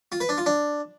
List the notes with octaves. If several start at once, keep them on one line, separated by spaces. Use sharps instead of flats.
F4
B4
D4
F4
D4